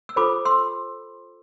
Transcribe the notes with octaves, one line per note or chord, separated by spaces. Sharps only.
E6
F4 A4 C5 B5 D6
C6 E6